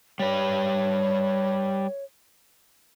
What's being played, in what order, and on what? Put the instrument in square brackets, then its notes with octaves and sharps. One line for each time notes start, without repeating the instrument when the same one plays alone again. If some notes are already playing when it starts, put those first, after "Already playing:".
[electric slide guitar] G3 B4 [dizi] C#5